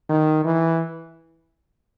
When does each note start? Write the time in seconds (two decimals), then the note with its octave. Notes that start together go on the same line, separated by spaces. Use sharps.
0.09 D#3
0.45 E3